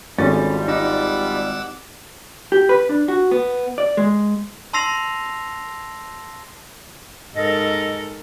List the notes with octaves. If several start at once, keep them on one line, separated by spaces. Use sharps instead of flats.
G#1 F3 G3 C#4 F#4 G#4 A4 A6
D#4 F#5 D6 E6
G4
B4
D4
F#4
B3
D5
G#3
A5 C6 E6 A#6 C7 F7
G#2 A4 A#4 D#5